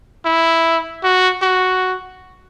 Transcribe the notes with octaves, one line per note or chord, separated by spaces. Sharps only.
E4
F#4
F#4